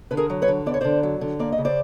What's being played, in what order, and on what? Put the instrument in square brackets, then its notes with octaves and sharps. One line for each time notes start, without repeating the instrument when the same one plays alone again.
[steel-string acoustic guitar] D3 B4
G#4 A#4
F#3
B4 C#5
D3
B3 D5
C#5
D3 C5 D5
F#3
D3
A#3 D5
D#5
C#3
C5 D5